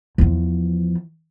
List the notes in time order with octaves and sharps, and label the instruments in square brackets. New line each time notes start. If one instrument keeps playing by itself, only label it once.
[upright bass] E2 F3